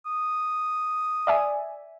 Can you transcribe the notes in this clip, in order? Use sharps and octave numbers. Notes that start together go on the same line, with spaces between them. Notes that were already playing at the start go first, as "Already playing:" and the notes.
D#6
D5 E5 G#5